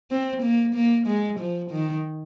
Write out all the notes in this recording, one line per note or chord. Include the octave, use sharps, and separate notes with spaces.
C4
A#3
A#3
G#3
F3
D#3